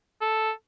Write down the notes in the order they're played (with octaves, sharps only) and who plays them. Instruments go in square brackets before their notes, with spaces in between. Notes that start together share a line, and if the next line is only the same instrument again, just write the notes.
[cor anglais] A4